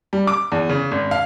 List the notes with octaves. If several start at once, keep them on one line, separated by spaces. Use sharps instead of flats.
G3
D6
E2
C#3
G#1
F5